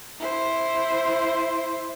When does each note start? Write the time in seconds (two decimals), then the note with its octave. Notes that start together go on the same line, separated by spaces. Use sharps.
0.19 E4 C5